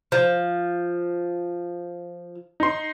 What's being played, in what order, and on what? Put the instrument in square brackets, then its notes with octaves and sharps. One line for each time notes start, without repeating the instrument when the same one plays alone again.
[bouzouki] F3
[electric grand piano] D#4 C6